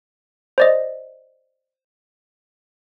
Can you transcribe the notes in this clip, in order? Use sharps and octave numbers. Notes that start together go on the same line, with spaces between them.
C5 D5 D#5